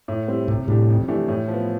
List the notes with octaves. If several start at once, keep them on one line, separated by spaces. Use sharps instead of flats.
A2
G3 C4 E4
A2 C3
A2 G3 D4 G4
F2
E3 A3 D4 G4
A2
F3 B3